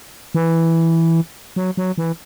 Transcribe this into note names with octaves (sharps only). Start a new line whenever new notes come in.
E3
F#3
F#3
E3